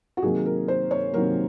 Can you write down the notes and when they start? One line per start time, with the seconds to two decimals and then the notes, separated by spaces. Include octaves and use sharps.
0.17 F#4
0.22 C3 D#3 F#3 A#3 G#4
0.46 A#4
0.68 C5
0.91 C#5
1.14 C3 D#3 F#3 A#3 A#4